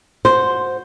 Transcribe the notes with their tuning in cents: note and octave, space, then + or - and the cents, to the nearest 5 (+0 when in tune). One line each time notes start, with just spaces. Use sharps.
F#4 -20 C5 +0